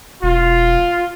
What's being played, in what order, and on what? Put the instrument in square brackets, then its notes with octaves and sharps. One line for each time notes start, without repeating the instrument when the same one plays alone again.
[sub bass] E1 [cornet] F4